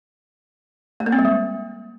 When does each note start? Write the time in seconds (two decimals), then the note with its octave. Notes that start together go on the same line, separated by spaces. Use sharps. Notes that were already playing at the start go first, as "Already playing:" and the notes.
1.00 A3
1.06 A#3
1.12 C4
1.19 G3
1.25 G#3